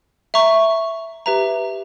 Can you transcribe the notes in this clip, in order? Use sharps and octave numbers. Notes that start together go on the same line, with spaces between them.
E5 A#5 C#6
G4 B4 E5 A#5